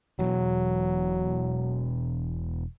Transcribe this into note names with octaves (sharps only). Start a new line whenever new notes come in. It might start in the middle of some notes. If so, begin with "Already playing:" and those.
E1 B2 E3 F#3